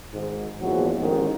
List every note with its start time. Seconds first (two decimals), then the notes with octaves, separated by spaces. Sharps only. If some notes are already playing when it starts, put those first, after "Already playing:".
0.13 G#1 G#2
0.61 A#1 E2 F3 F#3 G#3 F#4
1.01 A1 G#2 D#3